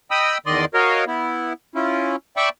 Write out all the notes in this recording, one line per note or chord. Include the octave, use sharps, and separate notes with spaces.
D#5 G5 B5 D#6 E6
E2 D#3 D5 D#5 C6
F#4 A#4 C#5 D#5 F5
B3 E4
C#4 E4 F4
D5 E5 G5 A5 B5 C#6